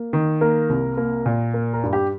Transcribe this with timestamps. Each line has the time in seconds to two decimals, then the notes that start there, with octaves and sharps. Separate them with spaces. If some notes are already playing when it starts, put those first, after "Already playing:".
Already playing: A#3
0.13 D#3
0.41 A#3 A#4
0.69 C2
0.97 A#3
1.26 A#2
1.54 A#3
1.73 A#4
1.83 G2
1.93 G4